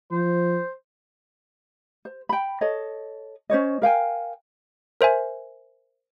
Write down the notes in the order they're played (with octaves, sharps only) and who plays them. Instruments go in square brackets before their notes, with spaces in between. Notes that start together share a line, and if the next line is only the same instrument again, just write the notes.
[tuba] F3 [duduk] C5
[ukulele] C5
G5 B5
A4 C#5 D#5
C#4 C5 C#5 D#5
A#4 F5 G5 G#5
[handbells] A#4 C5 E5 G#5